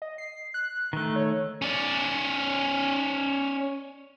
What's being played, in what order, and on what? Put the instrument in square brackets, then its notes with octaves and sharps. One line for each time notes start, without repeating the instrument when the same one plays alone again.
[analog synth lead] D#5
C7
F#6
[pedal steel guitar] D#3 A3
[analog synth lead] C#5
[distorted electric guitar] C#4 D5